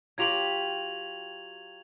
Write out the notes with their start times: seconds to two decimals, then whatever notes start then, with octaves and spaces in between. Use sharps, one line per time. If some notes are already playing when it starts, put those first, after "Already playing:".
0.18 F#3 F4 G4 G#6 F7 F#7